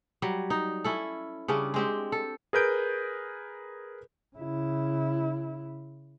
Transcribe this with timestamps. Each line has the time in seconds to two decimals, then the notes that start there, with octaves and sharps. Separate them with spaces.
0.22 F#3 G3
0.50 D#4
0.84 C#4 E4 A4
1.48 C#3 G3 C#4 D4
1.74 G#3 C4 G4
2.12 A4
2.53 G#4 A#4 B4 G6 D7
4.37 C#3 E4